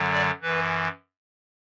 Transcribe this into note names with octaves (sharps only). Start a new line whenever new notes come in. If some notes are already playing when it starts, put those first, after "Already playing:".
Already playing: F#2 D3 F#3
D5
F#2 E3 B4